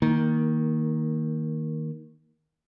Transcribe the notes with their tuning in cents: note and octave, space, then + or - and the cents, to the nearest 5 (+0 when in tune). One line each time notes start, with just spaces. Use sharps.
D#3 +10 A#3 -5